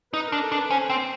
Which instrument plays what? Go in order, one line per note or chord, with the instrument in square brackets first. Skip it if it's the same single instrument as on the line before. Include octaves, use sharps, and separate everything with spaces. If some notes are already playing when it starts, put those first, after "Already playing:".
[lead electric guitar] D#4 [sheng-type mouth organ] B4
[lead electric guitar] D4 [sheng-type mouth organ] A#4
[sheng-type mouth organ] A4
[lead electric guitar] D4
[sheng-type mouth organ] B4
[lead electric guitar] C#4 [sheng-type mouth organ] C5
[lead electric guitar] C4